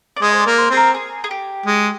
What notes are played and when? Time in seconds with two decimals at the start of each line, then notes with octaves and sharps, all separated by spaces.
0.17 D5
0.22 G#3 D#5
0.33 C5
0.40 D5
0.46 A#3
0.58 C5
0.70 C4 G#4
0.77 A#4
0.94 G#4
1.24 G#4
1.31 G4
1.66 G#3